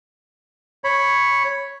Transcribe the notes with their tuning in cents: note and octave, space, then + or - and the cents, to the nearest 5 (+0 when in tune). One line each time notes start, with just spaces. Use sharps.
C#5 +0 B5 +0